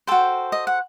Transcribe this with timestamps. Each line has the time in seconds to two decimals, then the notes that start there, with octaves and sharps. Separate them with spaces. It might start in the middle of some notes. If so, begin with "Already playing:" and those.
0.07 F#4 A4 C5 G5
0.52 D#5
0.67 F#5